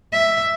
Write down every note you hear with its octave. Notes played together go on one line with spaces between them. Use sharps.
E5